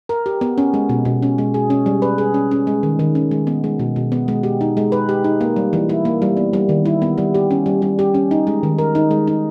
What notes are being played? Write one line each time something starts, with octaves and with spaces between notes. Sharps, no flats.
A#4
G4
B3
C#4
G#3
B2
B2
C#4
G#3
G#4
C#4
G3
B4
G#4
C#4
C#4
G#3
D#3
D#3
C#4
G#3
B3
G#3
B2
B2
B3
G#3
G4
D#4
G#3
B4
G4
D#4
A#3
G3
E3
E4
A#3
G3
B3
G3
D#3
E4
B3
G3
G4
C#4
G3
G3
G4
C#4
D#4
G#3
D#3
A#4
D#4
G#3
D#4